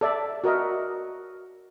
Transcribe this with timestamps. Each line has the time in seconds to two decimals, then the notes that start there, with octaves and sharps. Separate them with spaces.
0.01 A4 D5 E5
0.44 F#4 A#4 D#5 E5